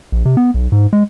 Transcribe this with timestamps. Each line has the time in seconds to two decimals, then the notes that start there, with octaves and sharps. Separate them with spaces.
0.12 A#1
0.25 C3
0.37 B3
0.54 B1
0.72 G#2
0.93 G#3